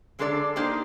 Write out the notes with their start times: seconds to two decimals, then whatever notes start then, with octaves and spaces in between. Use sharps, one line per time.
0.19 D3 G#3 D4 A4 C5 D5
0.56 A#3 D4 D#4 G4 C5